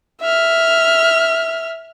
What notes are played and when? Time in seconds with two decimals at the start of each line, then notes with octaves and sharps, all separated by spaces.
0.22 E5 F6